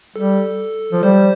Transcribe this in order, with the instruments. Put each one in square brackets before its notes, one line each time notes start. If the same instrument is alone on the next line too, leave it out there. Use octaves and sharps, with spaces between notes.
[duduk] G3 [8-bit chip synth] A4
[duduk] F3
[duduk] G3 [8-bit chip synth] C5